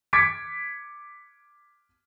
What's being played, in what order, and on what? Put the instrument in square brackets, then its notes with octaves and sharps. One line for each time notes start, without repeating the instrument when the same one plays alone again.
[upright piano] D6 G#6 A6 B6 C#7 D7